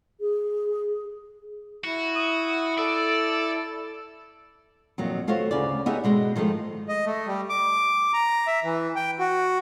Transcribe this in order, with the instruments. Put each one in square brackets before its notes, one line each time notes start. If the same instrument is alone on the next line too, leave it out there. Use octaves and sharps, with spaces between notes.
[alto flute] G#4
[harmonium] E4 [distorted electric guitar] F#4
[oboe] D#6
[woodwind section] A4 [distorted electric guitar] D5 [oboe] E6
[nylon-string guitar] F2 A#2 D#3 F#3
A3 F4 F#4 C5 C#5
D2 C#3 C#5 D5
B3 D#4 G4 G#4 C#5 E5
B2 G#3 F#4
D#3 F3 G#3 A3 F4
[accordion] D#5
A3
G3
D6
A#5
E5
E3
G5
F#4